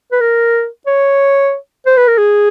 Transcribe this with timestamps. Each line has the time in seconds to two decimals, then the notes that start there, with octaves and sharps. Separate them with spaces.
0.12 B4
0.21 A#4
0.87 C#5
1.86 C5
1.97 B4
2.07 A#4
2.18 G#4